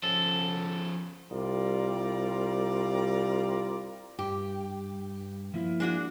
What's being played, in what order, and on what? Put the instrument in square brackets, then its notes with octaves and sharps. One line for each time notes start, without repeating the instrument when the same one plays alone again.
[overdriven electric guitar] F3 C#4 [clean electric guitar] A4
[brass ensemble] C2 G3 F4 D5 A#5
[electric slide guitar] G2 [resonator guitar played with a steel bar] G4
[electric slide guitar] F3 A#3 E4
[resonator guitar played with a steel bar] G#3 D4 F#4